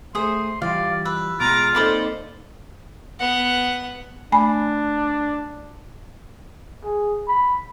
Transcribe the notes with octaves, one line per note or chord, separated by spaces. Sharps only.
A3 G#4 B4 C5 C6 D#6
E3 G3 F4 D5 F5
B4 E6
B2 G#3 F4 A#5 D6
A#3 C4 D#4 A4 C5 D5 B5
B3 F#5
A3 D4 G#5 B5
G#4
B5